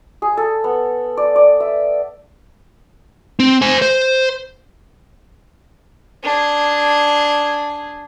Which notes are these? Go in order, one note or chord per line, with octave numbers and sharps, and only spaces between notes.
G#4
A4
B3
D5
D5
E5
C4
C5 G#5
C5
D4 G#4